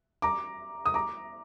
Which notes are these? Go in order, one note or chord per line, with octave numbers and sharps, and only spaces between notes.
A#5 D6
D#6
A#5 D6